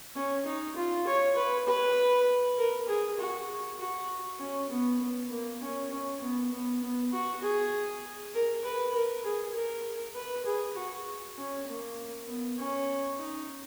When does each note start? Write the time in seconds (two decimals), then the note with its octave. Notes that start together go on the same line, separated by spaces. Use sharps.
0.15 C#4
0.46 D#4
0.76 F4
1.07 C#5
1.36 B4
1.67 B4
2.58 A#4
2.88 G#4
3.19 F#4
3.79 F#4
4.39 C#4
4.70 B3
5.01 B3
5.30 A#3
5.61 C#4
5.91 C#4
6.21 B3
6.52 B3
6.82 B3
7.12 F#4
7.43 G#4
8.34 A#4
8.65 B4
8.94 A#4
9.24 G#4
9.54 A#4
10.15 B4
10.45 G#4
10.76 F#4
11.37 C#4
11.68 A#3
12.27 B3
12.58 C#4
13.19 D#4